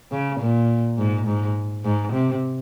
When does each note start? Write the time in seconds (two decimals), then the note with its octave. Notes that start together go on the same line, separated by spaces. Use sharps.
0.12 C#3
0.40 A#2
0.98 G#2
1.27 G#2
1.84 G#2
2.13 C3